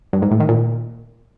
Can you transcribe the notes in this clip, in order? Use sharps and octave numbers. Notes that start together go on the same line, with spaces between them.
G2
G#2
A2
D#3
A#2